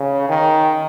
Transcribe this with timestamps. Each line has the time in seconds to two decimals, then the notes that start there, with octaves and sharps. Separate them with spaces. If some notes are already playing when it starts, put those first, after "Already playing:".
Already playing: C#3
0.29 D#3